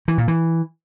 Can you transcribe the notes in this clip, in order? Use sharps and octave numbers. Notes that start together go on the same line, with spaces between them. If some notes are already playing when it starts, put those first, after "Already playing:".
E3
A#2
E3